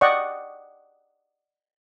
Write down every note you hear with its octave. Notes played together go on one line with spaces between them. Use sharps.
D5 D#5 F#5 G5 C#6